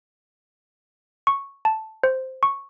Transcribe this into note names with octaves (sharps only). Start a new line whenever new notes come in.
C#6
A5
C5
C#6